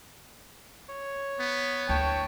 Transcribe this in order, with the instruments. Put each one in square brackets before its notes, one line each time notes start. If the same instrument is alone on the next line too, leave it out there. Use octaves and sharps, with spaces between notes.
[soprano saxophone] C#5
[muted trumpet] B3
[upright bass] D2 [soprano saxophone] C#5 [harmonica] G5 A5 C#6